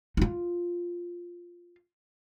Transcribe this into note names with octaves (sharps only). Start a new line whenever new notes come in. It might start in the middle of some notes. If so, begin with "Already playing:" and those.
D#4 F4